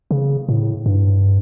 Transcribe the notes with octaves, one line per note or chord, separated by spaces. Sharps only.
C#3
A2
G2